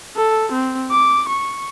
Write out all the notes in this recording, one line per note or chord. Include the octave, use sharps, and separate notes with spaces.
A4
C4
D6
C#6